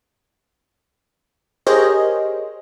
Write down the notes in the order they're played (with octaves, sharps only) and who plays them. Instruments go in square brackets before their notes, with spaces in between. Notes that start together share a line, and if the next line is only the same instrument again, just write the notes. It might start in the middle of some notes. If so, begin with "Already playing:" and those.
[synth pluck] G4 G#4 A#4 C5 C#5 D#5